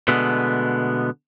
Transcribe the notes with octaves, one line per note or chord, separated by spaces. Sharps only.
B2 D3 G#3 A3 B3